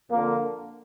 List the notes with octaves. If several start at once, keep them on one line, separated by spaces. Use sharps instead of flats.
F2 D3 A#3